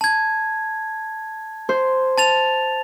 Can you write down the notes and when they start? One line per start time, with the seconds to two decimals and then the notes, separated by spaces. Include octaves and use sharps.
0.01 A5 G#6
1.69 C5
2.18 A5 A6 F7